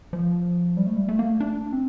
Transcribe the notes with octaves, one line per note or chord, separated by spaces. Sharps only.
F3
G3
A3
G3
A3
A#3
A3
D4
C4